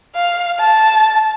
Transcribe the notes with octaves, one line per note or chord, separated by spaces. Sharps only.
F5
A5